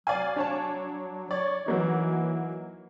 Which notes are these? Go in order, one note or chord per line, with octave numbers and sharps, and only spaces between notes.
F#3 D5 F5 G#5
D4 C#5 A5
C#5 D5
E3 F#3 A#3 D#4